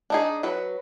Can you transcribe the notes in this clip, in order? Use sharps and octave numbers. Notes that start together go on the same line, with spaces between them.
D4 D#4 G#4
F#3 F#4 B4